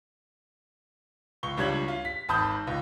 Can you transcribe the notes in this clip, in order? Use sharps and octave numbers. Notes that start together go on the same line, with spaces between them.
C#2 C#6 G7
C#2 G3 D4 C#5 G#6 F#7
F4
B6
G#1 A5 B5 D#6 G6
C#2